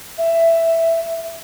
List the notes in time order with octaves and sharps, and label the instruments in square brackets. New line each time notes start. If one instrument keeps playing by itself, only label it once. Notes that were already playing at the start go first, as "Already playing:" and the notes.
[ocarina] E5